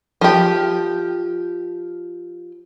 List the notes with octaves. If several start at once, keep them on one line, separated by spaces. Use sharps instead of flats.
F3 G4